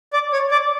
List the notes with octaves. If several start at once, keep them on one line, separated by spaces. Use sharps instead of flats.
D5
C#5
D5